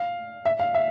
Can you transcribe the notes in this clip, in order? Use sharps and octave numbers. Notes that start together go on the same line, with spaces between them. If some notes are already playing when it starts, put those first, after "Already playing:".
Already playing: F5
E5
F5
E5